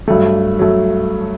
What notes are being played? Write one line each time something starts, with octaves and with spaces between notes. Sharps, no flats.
G2 F#3 A3
F#3 A3